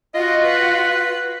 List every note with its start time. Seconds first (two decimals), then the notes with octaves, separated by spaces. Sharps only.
0.14 F4 F#4 D#5
0.43 B4